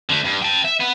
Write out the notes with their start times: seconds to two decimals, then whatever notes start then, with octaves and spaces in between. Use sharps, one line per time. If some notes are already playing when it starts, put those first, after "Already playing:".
0.09 D3 A3
0.24 G2
0.42 G5 A5
0.65 E5
0.80 B3